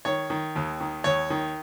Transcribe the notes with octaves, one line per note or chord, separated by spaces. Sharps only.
D#3 C#5
D#3
D#2
D#3
D#2 C#5
D#3